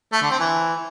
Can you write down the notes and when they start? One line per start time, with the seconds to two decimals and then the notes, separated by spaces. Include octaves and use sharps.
0.12 A3
0.21 D3
0.30 C4
0.39 E3